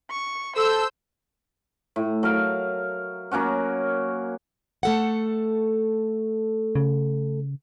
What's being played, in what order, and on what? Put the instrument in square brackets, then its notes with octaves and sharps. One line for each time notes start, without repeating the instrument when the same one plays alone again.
[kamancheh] C#6
[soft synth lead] A4 [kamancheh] C5 [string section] E6 G6
[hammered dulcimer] A2
F#3 A#4 F5
F#3 A#3 C#4 F#4
[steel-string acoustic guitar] A3 A4 F#5
[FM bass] C#3